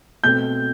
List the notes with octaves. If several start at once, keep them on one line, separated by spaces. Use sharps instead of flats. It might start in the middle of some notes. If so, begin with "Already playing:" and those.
B2 A3 C4 G6